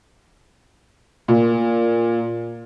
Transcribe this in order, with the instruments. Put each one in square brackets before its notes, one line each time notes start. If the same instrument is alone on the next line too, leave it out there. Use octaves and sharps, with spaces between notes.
[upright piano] A#2